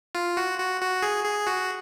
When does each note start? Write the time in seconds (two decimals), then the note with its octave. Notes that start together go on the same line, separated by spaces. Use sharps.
0.15 F4
0.37 F#4
0.59 F#4
0.81 F#4
1.02 G#4
1.24 G#4
1.47 F#4